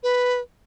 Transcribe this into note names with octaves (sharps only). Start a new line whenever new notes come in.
B4